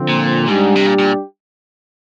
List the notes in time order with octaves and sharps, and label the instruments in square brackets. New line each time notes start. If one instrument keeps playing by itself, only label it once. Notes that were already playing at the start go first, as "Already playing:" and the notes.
Already playing: [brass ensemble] D3 F3 C4
[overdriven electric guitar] A#2
[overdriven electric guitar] G#2 [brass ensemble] G3 D4 G4
[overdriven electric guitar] C3
A#2
A#2